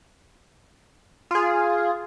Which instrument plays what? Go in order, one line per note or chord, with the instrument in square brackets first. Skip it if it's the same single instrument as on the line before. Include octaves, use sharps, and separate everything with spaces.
[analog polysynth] F4 G#4